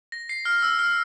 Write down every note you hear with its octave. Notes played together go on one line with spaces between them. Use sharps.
A#6
C7
F6
E6
F6